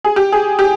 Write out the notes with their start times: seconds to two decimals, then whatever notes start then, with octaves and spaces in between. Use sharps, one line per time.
0.04 G#4
0.16 G4
0.32 G#4
0.59 G4